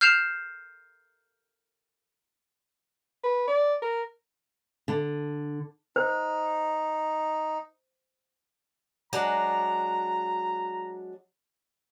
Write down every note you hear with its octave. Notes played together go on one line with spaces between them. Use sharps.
F6 G6 C7 E7 F7
B4
D5
A#4
D3
D#4 C5
F#3 G#3 D4 A#5